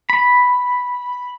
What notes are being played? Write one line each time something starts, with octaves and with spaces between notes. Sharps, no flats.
B5